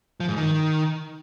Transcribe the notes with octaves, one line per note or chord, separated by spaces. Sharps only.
F3
G#2
D#3